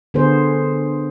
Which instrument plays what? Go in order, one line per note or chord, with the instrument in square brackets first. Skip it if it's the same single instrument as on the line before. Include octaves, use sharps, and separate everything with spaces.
[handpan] D3 B3 G#4 C5